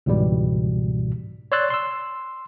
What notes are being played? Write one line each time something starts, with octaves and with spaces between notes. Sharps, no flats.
C#2 G#2 B2 E3 G3
C#5 D5 C6 E6 F#6 A6
C6 E6